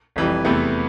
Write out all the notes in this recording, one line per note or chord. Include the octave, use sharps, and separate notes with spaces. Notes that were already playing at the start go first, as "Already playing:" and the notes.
F1 F2 E3 G3
E2 C3 E3 A3 B3